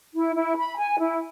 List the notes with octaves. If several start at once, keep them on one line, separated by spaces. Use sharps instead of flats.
E4
E4
B5
G#5
E4